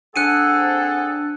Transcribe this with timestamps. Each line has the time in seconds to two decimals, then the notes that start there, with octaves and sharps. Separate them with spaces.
0.16 C4 D4 G#4 A4 F#5 F#6 C#7 D#7